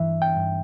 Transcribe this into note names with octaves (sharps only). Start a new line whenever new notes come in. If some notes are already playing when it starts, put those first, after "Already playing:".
Already playing: G2 E3 E5
G5
G2